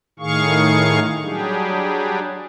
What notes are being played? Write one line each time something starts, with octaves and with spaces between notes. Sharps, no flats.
A2 D#3 G#4 F5 C#6
F#3 G3 D4 G4 G#4